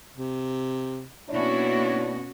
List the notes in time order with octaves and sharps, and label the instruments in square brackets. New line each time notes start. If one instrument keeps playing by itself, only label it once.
[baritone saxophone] C3
[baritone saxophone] B2 [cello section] A#3 C#4 F#4 [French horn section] D4 E4 C#5